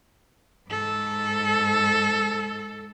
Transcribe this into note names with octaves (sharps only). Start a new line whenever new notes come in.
G#2 A4